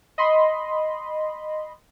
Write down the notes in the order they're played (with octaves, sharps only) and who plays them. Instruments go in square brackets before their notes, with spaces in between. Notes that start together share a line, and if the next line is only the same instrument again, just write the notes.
[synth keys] D#5 B5 C6